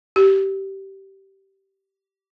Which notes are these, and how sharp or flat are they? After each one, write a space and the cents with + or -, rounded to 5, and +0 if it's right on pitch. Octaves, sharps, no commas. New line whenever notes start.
G4 -15